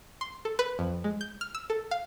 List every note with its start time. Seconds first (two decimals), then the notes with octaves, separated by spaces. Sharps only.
0.21 C6
0.45 A4
0.59 B4
0.79 F2
1.04 G#3
1.21 G6
1.41 F6
1.55 E6
1.70 A4
1.91 F5